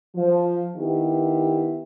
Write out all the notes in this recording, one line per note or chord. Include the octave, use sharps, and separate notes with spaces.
F3
D#3 B3 E4 G4